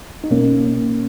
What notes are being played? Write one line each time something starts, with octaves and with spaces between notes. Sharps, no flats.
D#4
B2 A#3 C#4